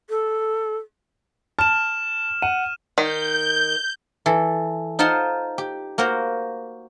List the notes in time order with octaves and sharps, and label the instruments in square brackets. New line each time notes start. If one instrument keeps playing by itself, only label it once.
[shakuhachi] A4
[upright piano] A5 [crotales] F6 E7
[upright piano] F#5 [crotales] D#7
[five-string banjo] D#3 [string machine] G6
[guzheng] E3 A4
D#4 F4 C5 F#5 A5 C6
G4
A#3 F#4 A#4 C5